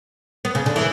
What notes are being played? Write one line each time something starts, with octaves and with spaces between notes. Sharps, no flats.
B3
C#3
D3
E3